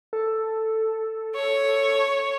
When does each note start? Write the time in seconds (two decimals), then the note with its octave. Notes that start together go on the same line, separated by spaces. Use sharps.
0.13 A4
1.35 C#5